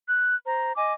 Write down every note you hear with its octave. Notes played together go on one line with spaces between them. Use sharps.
F#6
C5 A#5
D#5 G#5 D6